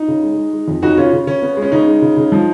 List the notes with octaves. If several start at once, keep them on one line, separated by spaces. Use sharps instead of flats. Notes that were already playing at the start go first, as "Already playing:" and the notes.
Already playing: D#4
C#3
G#3
G#3
G#3
F2
C#3 D#4 F#4
C#3 C#4 F4
C#3
C#3 C#4
B3
G#3
C#4
C#3 D#4
G#3
C#3
C#3
F3